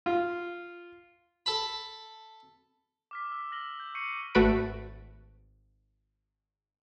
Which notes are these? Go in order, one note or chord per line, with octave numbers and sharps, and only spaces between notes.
F4
A4 A5 B5
D6 F6 B6
E6
E6 F6 A#6 F#7 G7
G6
C#6 G6 C7 C#7 D#7 F#7
G#1 A3 F#4 B4 B5 D7